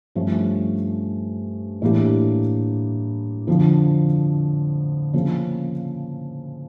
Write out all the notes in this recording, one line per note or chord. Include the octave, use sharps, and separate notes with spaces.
G2 F3 A3 C#4
A2 E3 A#3 D4 G4
F2 D3 F3
C#3 F3 A#3